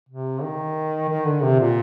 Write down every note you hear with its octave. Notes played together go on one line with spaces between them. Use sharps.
C3
D#3
D#3
D3
C3
A#2